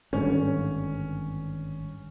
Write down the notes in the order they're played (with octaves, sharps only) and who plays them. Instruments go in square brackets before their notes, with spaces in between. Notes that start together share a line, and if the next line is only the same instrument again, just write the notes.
[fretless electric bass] G#1 G2 D3 [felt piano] C#4